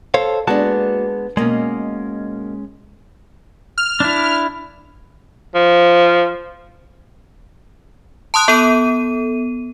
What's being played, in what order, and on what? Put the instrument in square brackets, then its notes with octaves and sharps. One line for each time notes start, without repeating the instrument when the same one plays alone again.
[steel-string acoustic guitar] A4 [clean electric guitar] C5 C#5 F5
[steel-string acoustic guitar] G#3 B3 D4 [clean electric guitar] A#3 F#4 A5
[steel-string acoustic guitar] B2 A#3 D#5 [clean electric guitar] G#3 C#4
[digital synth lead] F6
[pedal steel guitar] D4 E4
[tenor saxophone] F3
[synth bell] A5 C6 D#6 F#6
B3 A4 D#7